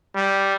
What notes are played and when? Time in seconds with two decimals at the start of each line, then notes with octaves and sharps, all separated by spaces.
0.15 G3